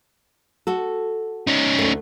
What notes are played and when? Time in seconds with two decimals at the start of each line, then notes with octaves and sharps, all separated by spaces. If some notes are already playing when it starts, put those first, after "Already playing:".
0.67 F#4 A4
1.47 C#4 D#4
1.79 D2 A3